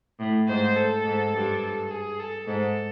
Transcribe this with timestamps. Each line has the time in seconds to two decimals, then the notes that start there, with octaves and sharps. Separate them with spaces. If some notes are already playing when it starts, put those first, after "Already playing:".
0.20 A2
0.48 G#2 C5
0.76 A4
1.05 G#2
1.33 G2
1.62 A4
1.91 G#4
2.20 A4
2.47 G#2 A4